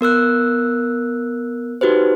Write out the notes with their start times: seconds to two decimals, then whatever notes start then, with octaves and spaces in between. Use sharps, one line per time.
0.01 B3 A#4 E6 F#6
1.81 D#4 F#4 G4 B4 C5